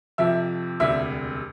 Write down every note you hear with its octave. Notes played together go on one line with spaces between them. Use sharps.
F2 C3 F3 E5
E1 D2 C3 G3 E5